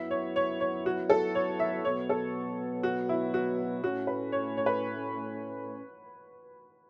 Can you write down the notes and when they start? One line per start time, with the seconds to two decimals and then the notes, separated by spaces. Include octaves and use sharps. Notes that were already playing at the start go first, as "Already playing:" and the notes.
Already playing: F#2 F#3 B3 E4 E5
0.11 C#5
0.36 C#5
0.60 C#5
0.86 F#4
1.10 A4
1.35 C#5
1.60 E5
1.85 B2 F#3 B3 C#5
2.09 A4
2.83 F#4
3.09 E4
3.34 F#4
3.84 A2 A3 C#4 F#4
4.07 B4
4.32 C#5
4.57 C#5
4.66 B4